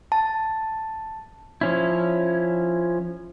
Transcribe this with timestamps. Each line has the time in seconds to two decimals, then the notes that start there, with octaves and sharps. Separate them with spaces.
0.12 A5
1.61 F3 C#4 E4